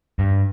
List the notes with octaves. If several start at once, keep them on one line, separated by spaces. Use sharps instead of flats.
G2